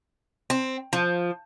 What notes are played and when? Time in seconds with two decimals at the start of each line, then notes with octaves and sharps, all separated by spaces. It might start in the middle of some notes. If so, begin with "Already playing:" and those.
0.50 C4
0.93 F3